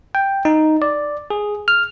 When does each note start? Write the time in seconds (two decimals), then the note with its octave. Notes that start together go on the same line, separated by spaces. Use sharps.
0.15 G5
0.45 D#4
0.82 D5
1.30 G#4
1.68 F6